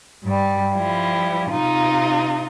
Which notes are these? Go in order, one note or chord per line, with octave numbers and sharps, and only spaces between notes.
G2 G3
F3 G3 E4
C3 D#4 F4